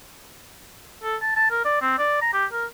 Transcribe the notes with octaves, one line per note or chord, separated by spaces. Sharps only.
A4
A5
A5
A#4
D5
C4
D5
A#5
G4
A#4